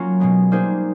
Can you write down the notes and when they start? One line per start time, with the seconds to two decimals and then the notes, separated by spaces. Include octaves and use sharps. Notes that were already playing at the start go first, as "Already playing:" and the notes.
Already playing: F#3 A#3 C#4 F4
0.20 B2 G#3 B3
0.51 G3 A#3 D#4 G#4 C5